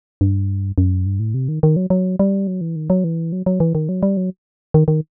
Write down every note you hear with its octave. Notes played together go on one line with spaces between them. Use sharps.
G2
F#2
G2
A2
C3
D#3
D#3
F#3
F#3
G3
F#3
E3
D#3
F#3
E3
F#3
F#3
E3
D#3
F#3
G3
F#3
D#3
D#3